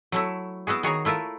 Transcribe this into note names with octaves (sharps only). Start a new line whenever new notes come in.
F#3 A3 E4
B3 E4 F#4 G#4
D#3 F#4 G#4 C#5 A#5
A3 E4 F4 A#4